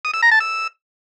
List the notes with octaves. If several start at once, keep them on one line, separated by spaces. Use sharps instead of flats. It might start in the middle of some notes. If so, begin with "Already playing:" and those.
D#6
E6
A#5
A5
E6